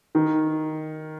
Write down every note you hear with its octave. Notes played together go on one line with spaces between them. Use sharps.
D#3